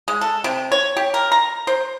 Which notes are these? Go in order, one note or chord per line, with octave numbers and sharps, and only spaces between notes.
G#3
A4
C3
C#5
G4
A#4
A#5
C5